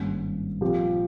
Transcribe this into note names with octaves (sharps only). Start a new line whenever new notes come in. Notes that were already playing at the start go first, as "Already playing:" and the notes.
Already playing: G#1 G2 G3 A#3 C#4
A#2 F3 C4 G4